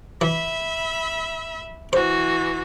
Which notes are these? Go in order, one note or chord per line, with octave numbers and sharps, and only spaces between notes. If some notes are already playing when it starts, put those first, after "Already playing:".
E3 E5 B5
E3 F#4 C5